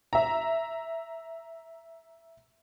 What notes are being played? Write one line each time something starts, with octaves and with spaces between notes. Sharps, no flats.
E5 A#5